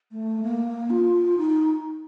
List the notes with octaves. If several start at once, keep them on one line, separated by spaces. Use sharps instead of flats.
A3
A#3
F4
D#4